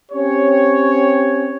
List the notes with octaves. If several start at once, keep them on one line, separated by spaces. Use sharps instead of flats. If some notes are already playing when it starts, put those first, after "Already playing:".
C4 C#4 G4 C#5